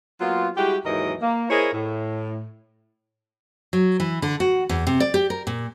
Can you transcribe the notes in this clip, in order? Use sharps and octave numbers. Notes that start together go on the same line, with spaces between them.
F#3 A#3 B3 F4
G3 G#3 E4 F#4 G4
D#2 G#2 E3 F#3 A#4 D#5
A#3
E4 G#4 A#4 C5 C#5 D#5
A2
F#3
E3
D3
F#4
E2
C3
D5
G4
A#4
A#2